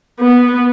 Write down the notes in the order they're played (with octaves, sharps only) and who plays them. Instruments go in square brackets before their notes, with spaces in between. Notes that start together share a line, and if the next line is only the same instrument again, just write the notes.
[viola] B3